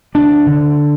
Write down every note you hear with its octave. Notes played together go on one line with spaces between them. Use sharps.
D2 D4
D3